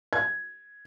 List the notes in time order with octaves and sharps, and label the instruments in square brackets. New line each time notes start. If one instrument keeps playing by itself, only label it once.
[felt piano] G#6